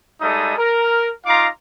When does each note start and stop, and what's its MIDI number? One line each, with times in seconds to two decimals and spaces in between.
0.21 0.56 55
0.21 0.56 56
0.21 0.56 63
0.21 0.56 69
0.21 0.56 76
0.21 0.56 87
0.57 1.10 70
1.26 1.48 63
1.26 1.48 65
1.26 1.48 77
1.26 1.48 82
1.26 1.48 84
1.26 1.48 86